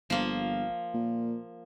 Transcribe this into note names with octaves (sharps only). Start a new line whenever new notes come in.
G1 F3 A#3
A#2